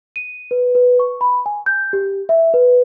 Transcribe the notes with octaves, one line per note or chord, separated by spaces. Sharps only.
D#7
B4
B4
C#6
B5
G#5
G6
G4
E5
B4